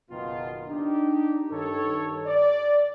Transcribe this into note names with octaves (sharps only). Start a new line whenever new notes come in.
F#1 B2 D#3 F4
D4 D#4 G4
G2 D#3 A4 C#5
D5